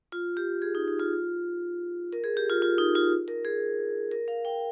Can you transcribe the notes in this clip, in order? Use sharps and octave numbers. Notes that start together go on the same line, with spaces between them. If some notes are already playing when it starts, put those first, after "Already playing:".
F4
G4
G#4
D#4
D#4
F4
A#4
G#4
G4
F4
F4
D#4
F4
A#4
G#4
A#4
F5
G5